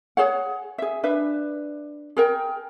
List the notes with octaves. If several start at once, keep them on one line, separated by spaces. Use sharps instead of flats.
G#4 C#5 F#5
G#4 E5
D4 B4 E5
G#4 A#4 G5